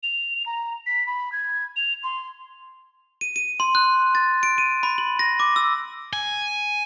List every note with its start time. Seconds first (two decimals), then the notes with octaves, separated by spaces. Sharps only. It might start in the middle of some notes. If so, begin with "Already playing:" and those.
0.03 F7
0.46 A#5
0.86 B6
1.07 B5
1.32 G#6
1.76 F7
2.04 C6
3.21 D#7
3.36 D#7
3.60 C6
3.75 F#6
4.15 A6
4.43 D7
4.58 D#7
4.83 B5
4.98 F#7
5.19 A#6
5.40 D6
5.56 E6
6.13 G#5